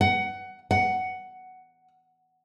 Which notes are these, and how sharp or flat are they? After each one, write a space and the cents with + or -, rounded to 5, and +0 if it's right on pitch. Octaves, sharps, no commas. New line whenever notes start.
F#5 +20
F#5 +10